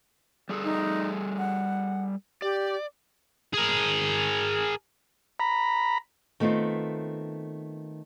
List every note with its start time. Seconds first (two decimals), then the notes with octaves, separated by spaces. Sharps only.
0.49 G3 G#4 A4
0.64 D#4
1.38 F#5
2.42 G4 D5
3.53 G#4 A#4
5.40 A#5 B5
6.40 D#3 A3 B3 C4 F4